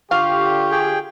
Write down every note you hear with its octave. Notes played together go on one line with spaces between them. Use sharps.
D3 F4 G4 F5 C#6
G#4 G5